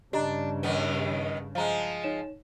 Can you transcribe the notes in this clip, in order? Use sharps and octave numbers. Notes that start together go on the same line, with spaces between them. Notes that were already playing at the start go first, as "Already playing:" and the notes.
G2 C#3 D4 G4 D#5 A#5
D#2 D#3 B3
F3 G#3 F5 A#5
D#4 C#5 E7